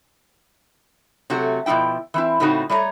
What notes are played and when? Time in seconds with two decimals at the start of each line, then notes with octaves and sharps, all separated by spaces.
1.30 C3 F#3 A3 F#4
1.66 B2 F3 C4 E4 G5
2.14 E3 C4 E4
2.40 A2 C#3 A3 C4 D#4 F#4
2.70 G3 A3 C#5 A#5